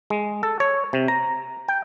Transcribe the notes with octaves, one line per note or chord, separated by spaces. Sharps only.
G#3
A4
C#5
C3
A#5
G5